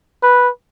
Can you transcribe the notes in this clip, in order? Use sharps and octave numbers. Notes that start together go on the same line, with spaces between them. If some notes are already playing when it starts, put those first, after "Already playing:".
B4